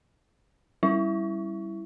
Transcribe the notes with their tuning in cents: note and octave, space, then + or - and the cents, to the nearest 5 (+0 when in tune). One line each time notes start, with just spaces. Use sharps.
G3 -5 E4 +0